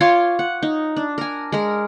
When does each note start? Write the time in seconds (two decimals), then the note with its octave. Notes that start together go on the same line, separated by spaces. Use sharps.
0.01 F4 C#5 C6 D6
0.39 F#5
0.62 D#4
0.97 D4
1.18 A#4 G#5
1.52 G#3 A#4